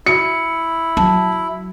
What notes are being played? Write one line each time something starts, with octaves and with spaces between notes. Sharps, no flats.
E4 F#4 C#7
F#3 A5